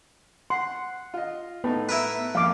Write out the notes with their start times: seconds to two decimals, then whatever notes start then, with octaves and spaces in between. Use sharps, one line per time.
0.50 F#5 C6
1.14 F4 D#5
1.64 A2 B3 D#4
1.89 E4 A#4 B4
2.35 F2 A#3 F5 D6